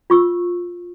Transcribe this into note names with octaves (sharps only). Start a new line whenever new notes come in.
F4 C#6 E6